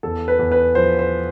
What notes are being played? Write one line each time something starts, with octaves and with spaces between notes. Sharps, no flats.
E2 A4
B4
E2
B4
F3 C5
C5